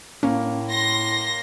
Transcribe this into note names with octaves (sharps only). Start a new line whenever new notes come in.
A2 A#3 C#4
C6 A#6